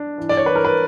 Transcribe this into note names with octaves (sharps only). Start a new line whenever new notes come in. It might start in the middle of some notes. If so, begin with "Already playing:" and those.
Already playing: D4
E3
D5
C#5
E3 B4
A#4
B4